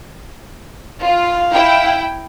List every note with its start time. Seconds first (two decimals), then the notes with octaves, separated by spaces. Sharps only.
1.04 F4 F5
1.53 E4 G5